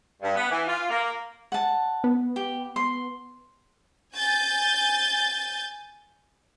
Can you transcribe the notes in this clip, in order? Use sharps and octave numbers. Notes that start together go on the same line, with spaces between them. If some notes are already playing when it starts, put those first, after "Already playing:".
G2
B3
E3
F4
A#3
F#5 A5
B3
G4
C6
G#5 G6 A6